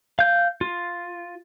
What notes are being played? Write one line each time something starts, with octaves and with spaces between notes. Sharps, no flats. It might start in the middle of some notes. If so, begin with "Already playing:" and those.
F5 G6
F4